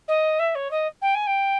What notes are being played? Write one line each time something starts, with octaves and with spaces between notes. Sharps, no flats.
D#5
E5
C#5
D#5
G5
G#5
G5